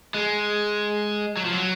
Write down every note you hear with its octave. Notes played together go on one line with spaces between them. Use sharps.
G#3
F#3
F3
F#3